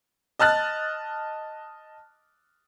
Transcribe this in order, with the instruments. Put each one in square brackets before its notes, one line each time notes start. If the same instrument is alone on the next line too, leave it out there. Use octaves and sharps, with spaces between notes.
[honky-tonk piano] D#5 A5 F6 F#6 A6